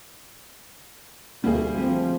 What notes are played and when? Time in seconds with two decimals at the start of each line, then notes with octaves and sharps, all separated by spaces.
1.44 D2 G3 A#3 G#4
1.78 F3 A3 C4